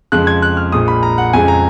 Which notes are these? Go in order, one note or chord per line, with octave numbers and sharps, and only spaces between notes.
F2 C#3 F3 G#3 F#6
G#6
F#6
F6
A#1 A#2 G#3 D#6
B5
A#5
F#5
F2 C#3 G#3 G#5
A#5